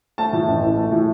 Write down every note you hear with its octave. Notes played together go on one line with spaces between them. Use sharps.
A3 A5
A2
A1
E3
A3
A2